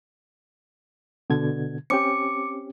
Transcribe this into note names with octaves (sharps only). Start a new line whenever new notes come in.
B2 D3 G#6
C4 C#4 G4 D6 C#7